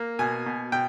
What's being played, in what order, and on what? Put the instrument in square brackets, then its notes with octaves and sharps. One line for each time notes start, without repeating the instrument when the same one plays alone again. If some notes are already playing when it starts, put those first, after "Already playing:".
Already playing: [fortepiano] A#3
B2 G#5
B2
B2 G5